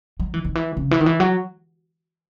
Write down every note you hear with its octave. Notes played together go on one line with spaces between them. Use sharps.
F#3
E3
D#3
E3
C#3
E3
D#3
E3
F#3